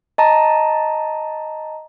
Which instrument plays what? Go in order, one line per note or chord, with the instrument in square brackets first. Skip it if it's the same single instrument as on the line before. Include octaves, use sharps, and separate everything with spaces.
[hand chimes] D#5 A5 A#5